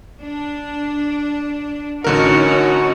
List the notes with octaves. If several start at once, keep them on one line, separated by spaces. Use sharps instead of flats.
D4
A1 D3 C#4 D#4 F#4 A#4